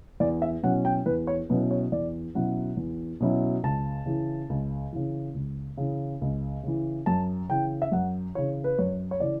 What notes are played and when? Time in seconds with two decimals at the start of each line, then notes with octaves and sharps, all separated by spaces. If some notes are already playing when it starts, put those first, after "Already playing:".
0.20 E2 D5
0.42 E5
0.63 B2 F#3 C#4 E4 F#5
0.85 G5
1.06 E2 B4
1.27 C#5
1.49 B2 F#3 C#4 E4 B4
1.71 C#5
1.92 E2 D5
2.35 B2 F#3 C#4 E4 F#5
2.77 E2
3.20 B2 F#3 C#4 E4
3.63 C#2 A5
4.06 C#3 E3
4.50 C#2
4.93 C#3 E3
5.34 C#2
5.77 C#3 E3
6.21 C#2
6.63 C#3 E3
7.06 F#2 A5
7.49 C#3 E3 G5
7.82 E5
7.92 F#2 F#5
8.35 C#3 E3 C#5
8.64 B4
8.79 F#2 C#5
9.11 C#5
9.20 C#3 E3 D5